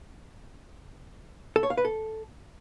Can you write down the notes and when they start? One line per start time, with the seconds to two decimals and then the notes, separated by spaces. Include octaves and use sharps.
1.56 A4
1.63 C#5
1.70 F5
1.77 B4
1.85 A4